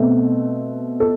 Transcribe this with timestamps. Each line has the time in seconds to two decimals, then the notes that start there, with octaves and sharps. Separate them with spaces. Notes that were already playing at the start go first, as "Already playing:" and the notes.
Already playing: B2 A3 C4
1.00 A4